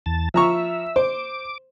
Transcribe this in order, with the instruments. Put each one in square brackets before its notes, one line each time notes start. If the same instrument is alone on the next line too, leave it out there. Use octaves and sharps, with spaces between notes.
[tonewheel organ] E2 A5
[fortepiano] F3 A#5 C#6 [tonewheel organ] E5
[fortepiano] C5 [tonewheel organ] D6